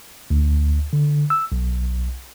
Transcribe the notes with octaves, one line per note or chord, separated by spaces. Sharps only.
D2
D3
E6
B1